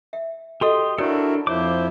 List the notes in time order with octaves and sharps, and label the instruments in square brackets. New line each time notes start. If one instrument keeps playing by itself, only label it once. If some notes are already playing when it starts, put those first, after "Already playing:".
[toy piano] E5
[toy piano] F#4 A4 D#5 [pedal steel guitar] G4 C6 D#6
[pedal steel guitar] D4 A4 [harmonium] E4 F#4 A#4 [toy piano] G4 C#5 D5
[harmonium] F2 F3 E4 [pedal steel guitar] C5 D6 [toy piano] C#5